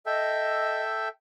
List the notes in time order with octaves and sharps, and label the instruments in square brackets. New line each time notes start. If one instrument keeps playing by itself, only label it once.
[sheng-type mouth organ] A4 E5 G5 [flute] D#5